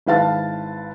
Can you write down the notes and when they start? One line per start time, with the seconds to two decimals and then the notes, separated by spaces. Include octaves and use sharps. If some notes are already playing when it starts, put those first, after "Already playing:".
0.06 G#1 E4 B4 F5 A5 A6